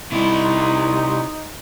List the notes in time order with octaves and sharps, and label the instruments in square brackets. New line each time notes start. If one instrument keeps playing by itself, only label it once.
[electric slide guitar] C3 E4 [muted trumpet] D#4